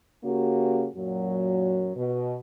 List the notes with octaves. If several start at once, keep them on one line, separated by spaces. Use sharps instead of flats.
C#3 A#3 C#4 F#4 G4
F#2 A#2 F#3
B2